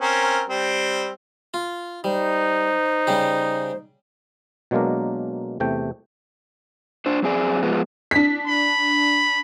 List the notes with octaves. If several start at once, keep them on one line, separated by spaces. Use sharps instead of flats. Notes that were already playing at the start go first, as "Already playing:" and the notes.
C4 C#4 A#4
G3 C4
F4
G3 D#4 C5
C#3 G3 G4
B2 F#3 G#3 A#3 D4 A#4
E2 C3 A3 G5
D4 C5
F#2 C4 G#4 D5
F3 G#3 B3
D4 B6
B5